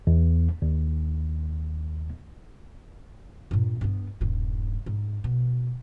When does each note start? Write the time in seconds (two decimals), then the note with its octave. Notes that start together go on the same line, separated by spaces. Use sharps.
0.07 E2
0.62 D#2
3.51 G2 A#2
3.81 G2 B3
4.21 D#1 G2
4.86 G#2
5.24 B2